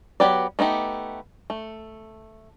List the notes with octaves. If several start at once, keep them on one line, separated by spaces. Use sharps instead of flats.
F#3 B3 G4 B4 D5
A3 B3 D#4 G4
A3